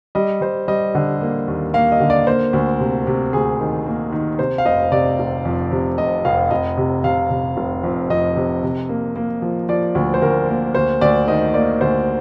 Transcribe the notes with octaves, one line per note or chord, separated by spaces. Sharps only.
G3 D#5
G3 C5
G3 D#5
D3
A#3
D#2
A#3 F5
D#5
D3
D5
A#3 C5
D2
C3
C3
D2 G#4
D#3
A#3
D#3
C3 C5
F5
F1 D#5
C3 D5
F1
F2
C3
F1 D#5
F1 F5
F1 D#5
C3
C3 F5
C3
F1
F2
F2 D#5
C3
C3
A#3
A#3
F3
F3 D5
D2
C5
D2 A#4
A#3
D2 C5
D2 D5
D#3 D#5
A#3 D5
D2 C5